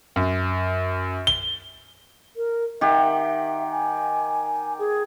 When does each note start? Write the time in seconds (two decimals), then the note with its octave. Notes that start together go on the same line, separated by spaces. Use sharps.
0.16 F#2
1.27 G7
2.36 A#4
2.81 D#3 G4 E5 F#5
3.71 G#5
4.79 G#4